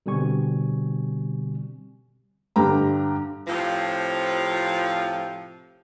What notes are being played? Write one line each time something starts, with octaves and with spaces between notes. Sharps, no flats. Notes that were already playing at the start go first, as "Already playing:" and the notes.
B2 D3 G3 C4 G#5 C#6
G2 D3 G4 G5 A#5
A2 C3 F3